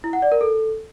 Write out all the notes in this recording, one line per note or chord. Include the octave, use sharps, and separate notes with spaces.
E4
F#5
D5
A#4
A4